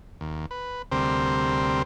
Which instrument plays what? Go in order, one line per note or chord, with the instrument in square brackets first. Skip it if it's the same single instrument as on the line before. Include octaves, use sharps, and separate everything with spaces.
[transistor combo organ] D#2
B4
D2 C3 G3 C4 A#4 C5